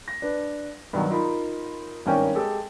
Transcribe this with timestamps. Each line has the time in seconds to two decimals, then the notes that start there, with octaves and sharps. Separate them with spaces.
0.08 A#6
0.22 D4 B4
0.93 G2 D#3 F#3 B3
1.10 D#4 F4 A#4 B5
2.06 G#1 G2 D#3 C#4 A#4 G5
2.35 G#3 G4 A4